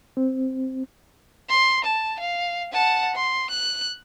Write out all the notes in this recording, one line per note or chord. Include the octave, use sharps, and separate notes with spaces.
C4
C6
A5
F5
F#5 A5
C6
F#6